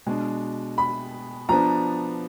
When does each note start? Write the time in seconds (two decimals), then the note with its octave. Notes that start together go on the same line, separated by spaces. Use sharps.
0.06 B2 G#3 D4
0.78 B5
1.49 F3 B3 D4 A#5